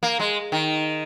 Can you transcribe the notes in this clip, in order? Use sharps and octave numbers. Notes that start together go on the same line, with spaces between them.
A#3
G#3
D#3